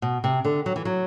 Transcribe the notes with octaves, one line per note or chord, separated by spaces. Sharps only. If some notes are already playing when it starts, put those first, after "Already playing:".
B2
C3
D3
F#3
E3
F#3